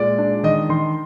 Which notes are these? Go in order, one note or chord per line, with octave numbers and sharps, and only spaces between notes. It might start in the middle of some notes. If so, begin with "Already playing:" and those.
Already playing: A#2 G#3 D5
D4
D#3 D#5
D#3 C6